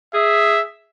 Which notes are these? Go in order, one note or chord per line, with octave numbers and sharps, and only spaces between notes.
G#4 E5